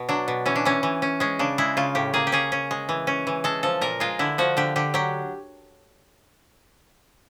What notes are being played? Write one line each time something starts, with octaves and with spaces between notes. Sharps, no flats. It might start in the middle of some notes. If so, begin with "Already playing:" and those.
Already playing: B2
F#3 D4
B2
E3 C#4
D4
E3 C#4
E3
C#4
G#3 C#4
C#3 D4
G#3 E4
C#3 F4
A2 G4
A#3 G#4
G4
C#4 G#4
C#4
G#3
E3
C#4
E3
G#3 A4
F3 A4
A#2 A#4
G#3 F4
D3 E4
F3 F#4
D3 G4
D3 G4
F#3 G4